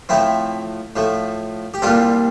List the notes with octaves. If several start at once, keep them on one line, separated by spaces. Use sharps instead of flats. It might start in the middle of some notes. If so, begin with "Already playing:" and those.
A2 F3 A3 C4 E4
A2 F3 A3
G4
C2 A#2 G3 C4 F4 A4